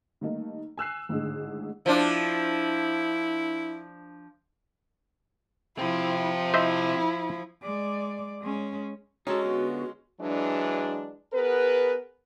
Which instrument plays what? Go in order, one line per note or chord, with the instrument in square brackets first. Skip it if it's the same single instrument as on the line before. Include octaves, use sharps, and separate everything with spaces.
[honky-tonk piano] D#3 G3 A3 A#3 D#4
G#5 E6 F#6 C7
G#1 A2 D3 D#4 G#4
[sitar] F3 D4 [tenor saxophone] E4
[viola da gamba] F3 [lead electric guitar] C4 G4 [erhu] E4
[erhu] E4 [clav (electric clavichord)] C5 D#5 E5
[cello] G#3 D5
G#3 C#4
[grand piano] G#3 C#4 [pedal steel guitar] D#4 A4 [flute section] F#4
[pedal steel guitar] D3 B3 F4
[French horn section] E3 F#3 G#3 D4
B3 G#4 A#4 B4